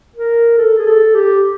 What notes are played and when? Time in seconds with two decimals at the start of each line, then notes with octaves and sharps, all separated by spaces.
0.16 A#4
0.58 A4
0.78 G#4
0.86 A4
1.14 G4